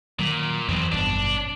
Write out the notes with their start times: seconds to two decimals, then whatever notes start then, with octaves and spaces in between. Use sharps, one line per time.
0.19 A#2 D#3 F#3
0.69 F2 B2 E3 F#3 C4
0.92 G#1 G2 B2 D4